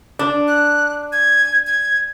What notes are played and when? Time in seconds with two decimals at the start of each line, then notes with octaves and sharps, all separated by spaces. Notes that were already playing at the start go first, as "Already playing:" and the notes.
0.19 D4
0.48 F#6
1.12 G#6
1.67 G#6